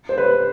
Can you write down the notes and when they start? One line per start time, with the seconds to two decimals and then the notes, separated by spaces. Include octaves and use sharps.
0.09 C5
0.18 B4